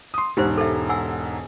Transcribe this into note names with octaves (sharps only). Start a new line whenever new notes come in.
C6 D#6
E1 G#2 G4 C5
A4 E5
F#5 G#5 E6